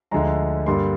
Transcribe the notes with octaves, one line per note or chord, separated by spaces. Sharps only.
D2 D3 F3 G#3 A#5
G2 D3 G3 A#3 C6